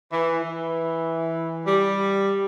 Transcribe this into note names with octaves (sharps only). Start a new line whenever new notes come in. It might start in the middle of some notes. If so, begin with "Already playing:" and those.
E3
E3
G3